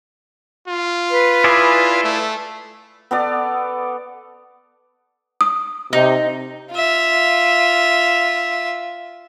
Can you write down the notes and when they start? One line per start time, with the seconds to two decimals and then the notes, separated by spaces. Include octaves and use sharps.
0.68 F4
1.10 B4
1.44 E4 G#4 D5
2.04 A3
3.11 B3 A4 D5
5.41 D#6
5.93 C3 D#4
6.71 F4 E5